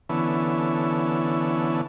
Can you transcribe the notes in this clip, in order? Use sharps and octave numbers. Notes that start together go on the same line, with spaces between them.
D3 E3 B3 C#4 E4 A4